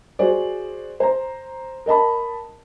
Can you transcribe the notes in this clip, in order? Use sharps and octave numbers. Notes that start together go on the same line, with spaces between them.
F#4 G#4 C5 D5
C5 A#5
A#4 D#5 A5 B5